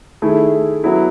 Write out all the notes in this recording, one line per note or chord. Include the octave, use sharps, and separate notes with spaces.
D#3 A3 E4 G#4
F#3 B3 E4